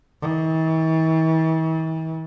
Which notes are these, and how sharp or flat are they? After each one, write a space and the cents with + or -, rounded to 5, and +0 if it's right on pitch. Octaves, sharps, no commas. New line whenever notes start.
E3 -45